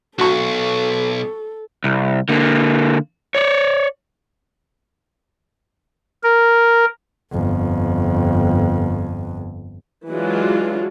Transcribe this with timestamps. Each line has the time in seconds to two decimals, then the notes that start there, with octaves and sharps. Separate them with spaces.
0.19 B1 F#4 A4 C#6
1.84 C2
2.29 D3 A#3
3.35 C#5 D5
6.23 A#4
7.31 G1 F2
10.09 E3 F#3 G#3 D4 F4 F#4